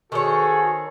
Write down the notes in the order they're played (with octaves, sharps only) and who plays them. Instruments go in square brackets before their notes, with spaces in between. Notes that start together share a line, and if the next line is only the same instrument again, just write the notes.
[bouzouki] D#3 C5 C#5 [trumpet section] F#4 G#4 A4